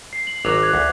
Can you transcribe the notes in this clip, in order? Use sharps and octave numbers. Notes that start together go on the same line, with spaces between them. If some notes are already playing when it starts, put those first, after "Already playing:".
C7
F#7
G#1 F#3 D6 F7
F#6 G#6 F7
D2